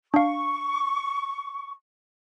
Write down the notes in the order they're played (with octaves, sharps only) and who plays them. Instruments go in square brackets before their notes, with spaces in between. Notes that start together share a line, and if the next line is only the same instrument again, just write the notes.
[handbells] D4 F5 [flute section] C#6